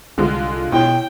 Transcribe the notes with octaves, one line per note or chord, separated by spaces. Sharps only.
C2 D3 G#3 F4
B2 E4 C#5 G5